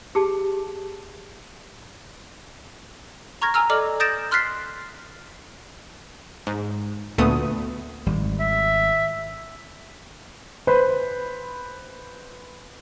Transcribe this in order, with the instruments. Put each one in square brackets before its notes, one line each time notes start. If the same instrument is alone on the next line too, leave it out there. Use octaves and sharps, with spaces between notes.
[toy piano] G4 G#4 A5
[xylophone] A#5 C#6 F6 G#6 A#6
G#5 A#5 E6 F6
A4 D5 D#5 D6 F6 F#7
D#6 G6 A6 A#6 D7 E7
C6 F6 F#6 A6 B6 C7
[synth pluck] G#2
D2 A#2 A3 B3 D#6
[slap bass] G#1 G3
[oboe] E5
[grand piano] B4 C5 B5